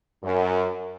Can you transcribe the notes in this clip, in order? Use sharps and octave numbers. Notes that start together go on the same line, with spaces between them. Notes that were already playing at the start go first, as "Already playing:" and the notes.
F#2